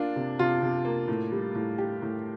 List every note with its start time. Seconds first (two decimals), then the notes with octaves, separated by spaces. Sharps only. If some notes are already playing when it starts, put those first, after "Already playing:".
Already playing: A#3 D4 F4
0.16 C3
0.39 C3 F4
0.62 C3
0.85 A#3
1.08 A2
1.32 G3
1.55 A2
1.78 G4
2.02 A2